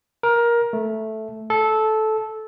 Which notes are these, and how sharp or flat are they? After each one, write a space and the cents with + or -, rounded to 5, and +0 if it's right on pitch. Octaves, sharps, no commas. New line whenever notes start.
A#4 +15
A3 -5
A4 -15